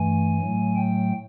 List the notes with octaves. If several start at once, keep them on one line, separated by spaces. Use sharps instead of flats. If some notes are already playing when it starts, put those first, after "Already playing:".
Already playing: G2 E3 A3 G#5
A2 F#3 A3
G5